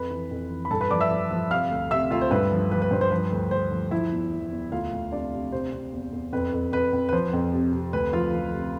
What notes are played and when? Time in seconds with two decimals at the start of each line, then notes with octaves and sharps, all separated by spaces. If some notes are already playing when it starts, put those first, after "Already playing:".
Already playing: F2 B4 B5
0.10 E3
0.31 F2
0.50 E3
0.65 B5
0.71 G2 A4 A5
0.81 B4 B5
0.91 F3 D5 D6
1.01 E5 E6
1.11 F3
1.31 F3
1.51 C3 F5 F6
1.71 D2
1.91 C3 E5 E6
2.11 D2 F4 F5
2.21 C5
2.31 G2 B4
2.52 F3
2.71 F3 B4
2.82 B4
2.91 G2 C5
3.01 C5
3.11 F3 B4
3.32 D2
3.51 D2 C5
3.71 F3
3.91 F3 E4 E5
4.12 E2
4.32 F3
4.52 E2
4.71 D2 F4 F5
4.92 D2
5.12 C3 D4 D5
5.33 C3
5.52 C3 C5
5.72 C3
5.93 E2
6.12 E2
6.33 F2 B4
6.53 F2
6.72 F2 B4
6.93 F2
7.09 B4
7.13 F3 C5
7.33 F2
7.53 C3
7.73 C3
7.93 D2 B4
8.13 F3 F4 F5
8.34 F3
8.53 C3